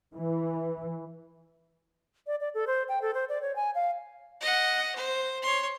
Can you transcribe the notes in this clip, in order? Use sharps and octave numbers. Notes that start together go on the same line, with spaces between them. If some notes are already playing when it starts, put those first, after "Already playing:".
E3
D5
D5
A4
C5
G5
A4
C5
D5
C#5
G#5
F5
D#5 F#5
C5
C#5 C6